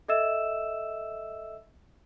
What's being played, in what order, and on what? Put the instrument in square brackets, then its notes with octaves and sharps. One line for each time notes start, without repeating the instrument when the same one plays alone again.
[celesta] A4 D#5 E5 E6 E7